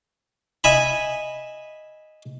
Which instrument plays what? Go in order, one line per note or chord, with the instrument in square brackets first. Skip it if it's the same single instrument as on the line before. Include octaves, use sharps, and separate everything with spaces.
[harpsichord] D#5 E5 G#5 B5